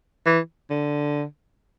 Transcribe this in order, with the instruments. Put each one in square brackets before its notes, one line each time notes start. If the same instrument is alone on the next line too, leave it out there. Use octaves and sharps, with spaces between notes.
[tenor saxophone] E3
D3